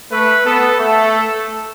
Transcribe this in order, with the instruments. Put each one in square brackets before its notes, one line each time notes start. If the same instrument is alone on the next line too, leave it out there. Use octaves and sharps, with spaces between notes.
[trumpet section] A3 [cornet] B4
[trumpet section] B3 [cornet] A4
[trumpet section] A3 [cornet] A4